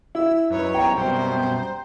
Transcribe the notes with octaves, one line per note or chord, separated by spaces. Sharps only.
E4 E6
F#2 D#4 B4 C#5
B1 F#2 C3 G3 G5 A#5
B2 C5